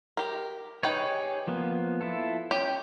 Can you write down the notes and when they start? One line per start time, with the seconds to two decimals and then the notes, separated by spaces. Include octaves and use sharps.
0.17 G4 A#4
0.83 D#4 G4 G#4 B4 C#5 G5
1.47 F3 A#3 B3
2.01 E4 F4 A4
2.51 C#4 G4 G5